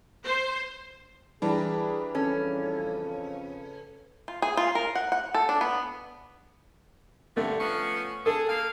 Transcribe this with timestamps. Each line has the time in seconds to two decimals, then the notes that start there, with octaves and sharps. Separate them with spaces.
0.24 C5
1.42 E3 G3 D4 G#4 B4 A#5
2.15 F2 C#3 C#4 A4
4.28 F4
4.42 G#4
4.57 F4
4.75 A#4
4.95 F#5
5.12 F#5
5.34 A4
5.49 D4
5.61 B3
7.37 G2 D3 A3
7.60 F3 B3 C#4
8.26 G#4 A4
8.47 A#3 F5